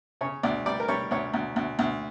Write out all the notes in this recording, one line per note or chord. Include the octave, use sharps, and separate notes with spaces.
C#3 C#5
D2 D5
G3 D5
A#4
G3 C#5
D2 C#5
D2
D2
D2